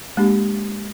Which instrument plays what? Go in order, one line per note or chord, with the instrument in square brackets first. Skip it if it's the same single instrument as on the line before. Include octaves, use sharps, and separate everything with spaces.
[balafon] G#3 A#3 D4 G4